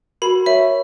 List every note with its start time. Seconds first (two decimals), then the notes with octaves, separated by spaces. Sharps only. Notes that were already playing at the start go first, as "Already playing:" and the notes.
0.22 F#4 A#4 B5
0.46 A#4 C#5 E5